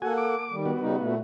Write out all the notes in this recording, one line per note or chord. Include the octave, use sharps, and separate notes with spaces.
A#3 F#4 A4 F#5 G#5
D6
D#3 G3
B3 F#4
C#3 G3 D#4
A#2 A3